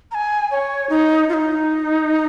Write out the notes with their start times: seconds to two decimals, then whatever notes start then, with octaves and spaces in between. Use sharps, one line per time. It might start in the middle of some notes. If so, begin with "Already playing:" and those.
0.11 A#5
0.15 G#5
0.51 C#5
0.90 D#4
1.29 F4
1.34 D#4